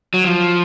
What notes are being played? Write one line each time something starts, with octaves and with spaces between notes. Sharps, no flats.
F#3
F3